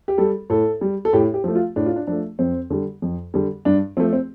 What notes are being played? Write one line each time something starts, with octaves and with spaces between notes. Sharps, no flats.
G4
G3 A4
A2 A4
G3
A4
A2 G4
G4
F3 A3
F4
A2 D4
F4
D4
F3 A3 D4
F2 C4
D3 G3
F2
D3 G3
G2 D4
F3 A3 C4
C4